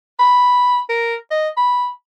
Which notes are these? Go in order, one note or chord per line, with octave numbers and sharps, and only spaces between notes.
B5
A#4
D#5
B5